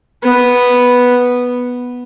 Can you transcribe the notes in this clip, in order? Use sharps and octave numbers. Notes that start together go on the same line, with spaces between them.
B3